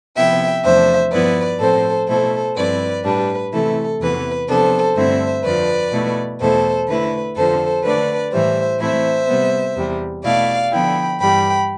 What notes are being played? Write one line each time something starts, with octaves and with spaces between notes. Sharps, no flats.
C3 F3 B3 E4 E5 G5
E2 C3 F3 A3 D4 C5 E5
G2 F3 B3 E4 B4 D5
A2 F3 C4 A4 C5
B2 A3 E4 A4 C5
G2 F3 C4 E4 B4 D5
A2 G3 D4 B4
C3 E3 A3 E4 A4
E2 C3 E3 B3 B4
C3 F3 B3 D4 A4 C5
G2 D3 A3 C4 E4 C5 E5
F2 D3 F3 B4 D5
B2 A3 E4
E2 B2 A3 E4 A4 C5
D3 A3 E4 B4
F2 D3 F3 A4 C5
D3 A3 D4 B4 D5
A2 E3 G3 C5 E5
A2 E3 A3 C4 E4 C5 E5
C3 G3 B3
E2 C3 G3
B2 A3 E4 D5 F5
D3 F3 B3 E4 G5 B5
G2 E3 G3 G5 B5